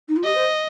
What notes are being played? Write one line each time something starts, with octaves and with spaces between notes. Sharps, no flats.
D#4
F4
G4 D#5
C5